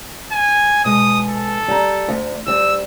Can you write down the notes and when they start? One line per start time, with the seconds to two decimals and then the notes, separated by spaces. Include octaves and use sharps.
0.32 G#5
0.85 B2 G#3 D#6
1.29 A4
1.68 G3 A#5
2.08 D2
2.47 D2 G3 E6